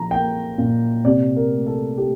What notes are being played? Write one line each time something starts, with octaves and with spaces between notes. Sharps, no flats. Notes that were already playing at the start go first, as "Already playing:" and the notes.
Already playing: A#2 F3 A#5
A#3 G5
A#2
C3 D5
A#4
A3
A4
A3 G4